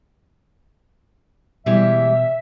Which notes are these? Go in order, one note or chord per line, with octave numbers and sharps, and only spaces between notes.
B2 E3 G3 G#3 E5